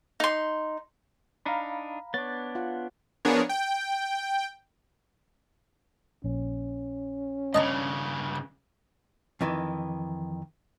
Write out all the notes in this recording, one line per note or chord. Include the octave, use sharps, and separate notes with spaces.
D#4 C6
D4 D#4 F5 A#5 B5
B3 D4 C#5 A6
F4 F#5
F3 B3 D4 G#4 A#4 C#5
G5
A#1 C#4
G2 C#3 D#5 A5 A#5
F2 D#3 E3